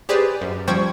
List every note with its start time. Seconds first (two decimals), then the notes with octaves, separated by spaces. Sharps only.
0.09 G4 G#4 B4 C5 D5
0.41 F#2
0.68 F3 G3 C5 G5 C#6 G#6